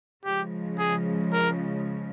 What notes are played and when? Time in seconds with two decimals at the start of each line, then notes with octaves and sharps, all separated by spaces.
0.25 C#3 F3 G#3 G4
0.79 G#4
1.33 A#4